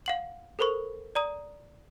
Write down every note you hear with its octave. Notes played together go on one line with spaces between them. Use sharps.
F5 F#5 F#7
A4 A#4 C5 B5 C#6
D5 A#5 D#6